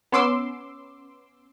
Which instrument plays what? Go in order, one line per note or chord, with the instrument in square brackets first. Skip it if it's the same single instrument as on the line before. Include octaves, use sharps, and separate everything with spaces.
[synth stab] B3 C#4 C6 D6 E6